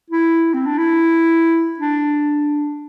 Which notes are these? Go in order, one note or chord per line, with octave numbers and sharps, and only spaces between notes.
E4
C4
D4
E4
D4